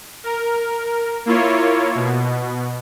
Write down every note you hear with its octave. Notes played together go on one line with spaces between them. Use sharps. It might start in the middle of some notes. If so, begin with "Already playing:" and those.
A#4
A#3 E4 F4 C#5
B2